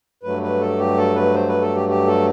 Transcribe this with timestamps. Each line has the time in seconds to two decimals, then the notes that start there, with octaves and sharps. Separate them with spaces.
0.23 G2 F#3 A3 B4
0.43 B4
0.61 A4
0.79 G4
0.97 A4
1.16 B4
1.34 C5
1.48 B4
1.62 A4
1.75 G4
1.89 G4
2.07 A4